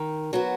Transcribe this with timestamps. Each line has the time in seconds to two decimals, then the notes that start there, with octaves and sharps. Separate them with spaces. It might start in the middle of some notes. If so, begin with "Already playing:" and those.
Already playing: D#3
0.33 F#3 B3 F#4